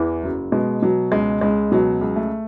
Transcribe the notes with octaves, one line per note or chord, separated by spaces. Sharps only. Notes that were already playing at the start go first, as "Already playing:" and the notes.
Already playing: E2 E3
F#1 F#3
B2 G#3
B2 F#3
C#2 G#3
C#2 G#3
B2 F#3
C#2
A3